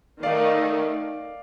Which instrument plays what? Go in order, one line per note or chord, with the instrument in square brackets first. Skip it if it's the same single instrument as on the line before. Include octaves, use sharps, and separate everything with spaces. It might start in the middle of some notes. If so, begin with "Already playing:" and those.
[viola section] D#3 A3 D#4 [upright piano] D5 F5